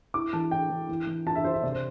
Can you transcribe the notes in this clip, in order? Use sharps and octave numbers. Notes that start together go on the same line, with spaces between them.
E4 D6
E3 A5
E4 G5
E3
E3
E3
F4 A5
E5
F4 C5
E5
C3 D5
C5